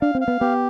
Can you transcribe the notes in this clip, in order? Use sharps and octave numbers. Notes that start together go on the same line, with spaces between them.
D4 F5
C4
F5
B3
B3 G4